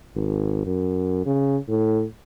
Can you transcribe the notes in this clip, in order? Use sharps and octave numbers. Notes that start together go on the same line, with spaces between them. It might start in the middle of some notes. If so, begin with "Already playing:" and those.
G#1
F#2
C#3
A2